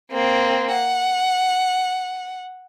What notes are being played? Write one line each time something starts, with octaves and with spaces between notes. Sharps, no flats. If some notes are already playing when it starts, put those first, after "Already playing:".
A#3 C4
F#5